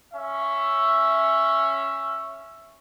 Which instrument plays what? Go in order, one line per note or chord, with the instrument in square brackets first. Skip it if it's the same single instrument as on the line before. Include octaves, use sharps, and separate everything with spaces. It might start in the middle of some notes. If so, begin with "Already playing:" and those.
[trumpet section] C#4 E5